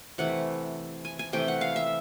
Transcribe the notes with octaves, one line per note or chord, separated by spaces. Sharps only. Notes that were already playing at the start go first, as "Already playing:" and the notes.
C3 E3 A3 F#5
G#5
G#5
C3 E3 A3 G5
F#5
F5
E5